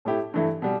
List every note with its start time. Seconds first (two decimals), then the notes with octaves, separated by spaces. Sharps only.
0.05 A2 A3 E4 G4
0.34 G2 E3 A3 E4
0.62 B2 G3